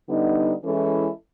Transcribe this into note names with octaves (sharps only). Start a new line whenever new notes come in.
D3 G3 B3 D#4
E3 G#3 C#4 E4 A4